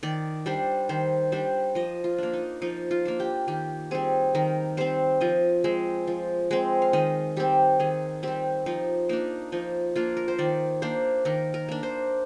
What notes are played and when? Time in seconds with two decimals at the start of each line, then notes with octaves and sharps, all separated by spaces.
0.03 D#3 D5
0.46 G3 D4 C5
0.89 D#3 C5
1.32 G3 D4 C5
1.75 F3 D#5
2.04 F4
2.18 A#3 D4
2.33 D#4
2.62 F3 D#4
2.91 F4
3.05 A#3 D4
3.20 G4
3.48 D#3 G4
3.91 G3 C4 G#4
4.35 D#3 A#4
4.77 G3 C4 C5
5.21 F3 D#5
5.64 G#3 C4
6.07 F3
6.51 G#3 C4
6.82 F5
6.93 D#3 D#5
7.37 G3 C4 G4
7.80 D#3 G#4
8.23 G3 C4 G4
8.66 F3 D#4
9.09 A#3 D4 D#4
9.52 F3 D#4
9.96 A#3 D4 F4
10.17 A#4
10.28 C5
10.39 D#3 D5
10.82 A#3 D4 C5
11.25 D#3 A#4
11.54 A#4
11.69 A#3 D4
11.83 C5